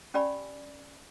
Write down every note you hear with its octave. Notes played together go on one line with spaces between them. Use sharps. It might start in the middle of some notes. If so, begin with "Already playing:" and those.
C#4 G4 D5 G#5 B5